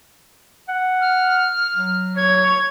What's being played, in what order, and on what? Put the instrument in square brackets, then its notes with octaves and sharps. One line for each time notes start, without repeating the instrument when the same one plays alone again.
[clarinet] F#5
[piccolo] F6
[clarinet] F#3
[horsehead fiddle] C#5 [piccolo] G#6